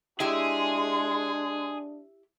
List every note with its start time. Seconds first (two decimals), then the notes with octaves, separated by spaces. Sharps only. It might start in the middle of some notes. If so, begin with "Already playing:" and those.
0.20 G#3 D4 E4 G4 G#4 E5 C6